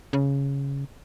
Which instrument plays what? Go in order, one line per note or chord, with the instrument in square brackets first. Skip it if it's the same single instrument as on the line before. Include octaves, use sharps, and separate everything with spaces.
[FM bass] C#3